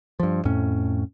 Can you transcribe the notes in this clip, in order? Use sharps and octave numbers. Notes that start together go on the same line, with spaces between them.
G2 F3
F2 A2 C#4